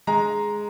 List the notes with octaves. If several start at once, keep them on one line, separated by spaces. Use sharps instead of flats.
G#3 A#5